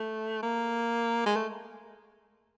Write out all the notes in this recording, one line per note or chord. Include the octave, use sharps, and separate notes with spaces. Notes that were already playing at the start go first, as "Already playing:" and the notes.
Already playing: A3
A#3
G#3
A3